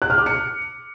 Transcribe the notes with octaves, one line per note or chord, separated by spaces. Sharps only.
F#6
F6
D6
C#7